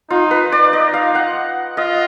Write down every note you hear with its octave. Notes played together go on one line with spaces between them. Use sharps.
D#4 F4
B4
D#4 D5
D#5
F5
F#5
F4 D#5